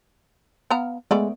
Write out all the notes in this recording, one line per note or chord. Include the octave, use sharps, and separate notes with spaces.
B3 F5 A#5
G#3 A3 B3 D5